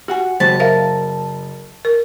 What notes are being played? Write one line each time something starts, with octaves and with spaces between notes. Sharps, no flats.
F#4 G4 F#5 G#5
F#1 G#3 F#4 G4 C5 A5
A#4 C5 E5 F5
A#4